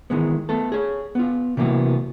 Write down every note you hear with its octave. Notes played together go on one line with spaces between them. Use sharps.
D#3 E3 G#3 B3
A3 B3 A4
G#4 C#5
B3 F4
C3 E3 F#3 A#3 B3